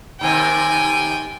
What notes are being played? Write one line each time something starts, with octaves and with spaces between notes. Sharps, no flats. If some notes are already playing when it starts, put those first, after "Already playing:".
D#2 C3 G5 G#5